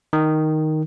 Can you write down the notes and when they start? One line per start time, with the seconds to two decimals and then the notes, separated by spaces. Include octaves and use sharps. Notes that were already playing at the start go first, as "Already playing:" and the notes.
0.13 D#3